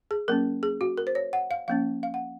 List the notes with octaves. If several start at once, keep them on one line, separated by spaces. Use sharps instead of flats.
G#4
F#3 A#3 C#4 A#4
G#4
F#4
A#4
C5
C#5
F#5
F5
F3 A#3 C#4 F5
F5
F#5